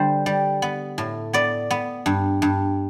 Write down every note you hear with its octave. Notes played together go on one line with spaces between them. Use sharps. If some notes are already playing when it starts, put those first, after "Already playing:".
Already playing: D3 G3 C5
G3
B3
A2
B3 D5
B3
G2
G2